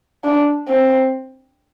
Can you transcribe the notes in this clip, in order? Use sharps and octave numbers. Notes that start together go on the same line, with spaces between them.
D4
C4